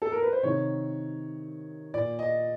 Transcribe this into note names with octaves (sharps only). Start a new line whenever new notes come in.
A4
A#4
B4
C5
C3 D#3 C#5
A#2 D5
D#5